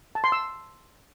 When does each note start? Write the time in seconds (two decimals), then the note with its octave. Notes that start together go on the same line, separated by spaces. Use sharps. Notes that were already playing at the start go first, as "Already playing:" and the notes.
0.15 A5
0.24 C6
0.32 E6